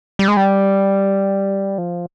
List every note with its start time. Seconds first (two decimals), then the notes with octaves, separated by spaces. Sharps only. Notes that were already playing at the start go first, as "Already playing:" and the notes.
0.19 G3
0.28 G#3
0.37 G3
1.78 F3